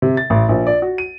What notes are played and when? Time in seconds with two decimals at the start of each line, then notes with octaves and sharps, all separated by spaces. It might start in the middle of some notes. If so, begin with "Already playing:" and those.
0.02 C3
0.17 A6
0.30 A1
0.49 A#1
0.67 D5
0.82 F#4
0.98 D#7